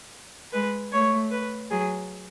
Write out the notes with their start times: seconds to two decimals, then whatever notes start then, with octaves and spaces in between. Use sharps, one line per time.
0.53 G#3 B4
0.92 A3 C#5
1.31 B4
1.71 F#3 G#4